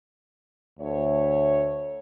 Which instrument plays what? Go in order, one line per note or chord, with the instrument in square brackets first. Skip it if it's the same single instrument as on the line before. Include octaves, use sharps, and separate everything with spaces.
[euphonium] D2 [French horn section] A3 C#5